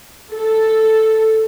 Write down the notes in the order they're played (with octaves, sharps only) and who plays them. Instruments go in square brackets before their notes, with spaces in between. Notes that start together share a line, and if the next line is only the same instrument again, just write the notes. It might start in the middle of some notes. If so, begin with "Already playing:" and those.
[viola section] A4